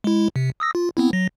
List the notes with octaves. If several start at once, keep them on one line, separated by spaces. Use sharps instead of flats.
G#3 E4
C3
D#6 E6 A#6
F4
B3 C4 E4
F#3 A#6